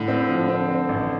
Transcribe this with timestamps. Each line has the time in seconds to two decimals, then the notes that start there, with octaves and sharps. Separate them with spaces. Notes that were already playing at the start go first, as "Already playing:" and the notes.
Already playing: A2 D3
0.08 C4
0.29 F3
0.48 C4
0.68 C4
0.89 A1